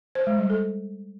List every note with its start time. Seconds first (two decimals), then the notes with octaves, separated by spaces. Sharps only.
0.15 C5
0.27 G#3
0.38 G3
0.50 A4